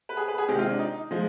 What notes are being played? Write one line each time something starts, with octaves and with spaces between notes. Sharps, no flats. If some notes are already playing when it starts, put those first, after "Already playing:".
B4
G#4
B4
G#4
C3 D#3 G#3 G4
F4
D4
D#4
F3 G#3